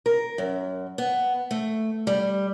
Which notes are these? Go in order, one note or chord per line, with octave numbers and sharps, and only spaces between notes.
A#4
F#2
B3
A3
G3